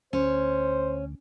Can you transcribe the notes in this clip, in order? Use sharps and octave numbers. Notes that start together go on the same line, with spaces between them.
D2 C#4 C5